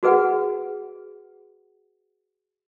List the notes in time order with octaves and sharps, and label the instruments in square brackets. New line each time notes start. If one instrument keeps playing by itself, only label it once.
[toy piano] F#4 G#4 B4 F#5